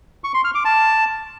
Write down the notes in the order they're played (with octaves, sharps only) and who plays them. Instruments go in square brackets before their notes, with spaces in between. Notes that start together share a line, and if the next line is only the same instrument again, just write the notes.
[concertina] C#6
C6
F6
D6
A5